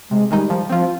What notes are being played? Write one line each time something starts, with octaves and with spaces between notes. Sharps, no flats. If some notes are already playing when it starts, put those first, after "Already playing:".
C3 G#3
D#3 G3 G#3 D#4
F3
F3 C4 F4